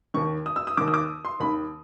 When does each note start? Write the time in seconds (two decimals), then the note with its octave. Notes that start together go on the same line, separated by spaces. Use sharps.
0.14 D#2 D#3 C#6
0.46 D#6
0.56 E6
0.67 D#6
0.77 D#3 D6
0.81 D#2
0.88 D#6
0.94 D6
1.25 C6
1.40 D#2 D#3 B5